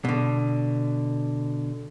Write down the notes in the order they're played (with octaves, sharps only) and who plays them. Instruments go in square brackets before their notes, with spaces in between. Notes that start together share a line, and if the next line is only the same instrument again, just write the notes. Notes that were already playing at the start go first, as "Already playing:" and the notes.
[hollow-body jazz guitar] B2 D3